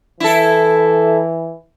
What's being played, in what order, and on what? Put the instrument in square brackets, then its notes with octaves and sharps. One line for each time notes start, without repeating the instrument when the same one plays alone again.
[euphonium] E3 [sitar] E4 A4